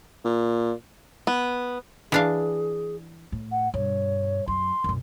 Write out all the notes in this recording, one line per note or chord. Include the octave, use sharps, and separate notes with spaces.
A#2
B3
E3 D4 G#4 F5
A2
F#5
G2 B2 C#5
F#2 F#3 C6
B1 F#2